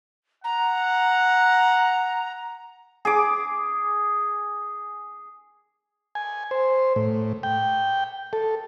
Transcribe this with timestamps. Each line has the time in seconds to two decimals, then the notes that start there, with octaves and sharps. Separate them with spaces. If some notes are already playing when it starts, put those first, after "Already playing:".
0.44 F#5 A#5
3.05 G#4 D6
6.15 G#5
6.51 C5
6.96 A2
7.43 G5
8.33 A4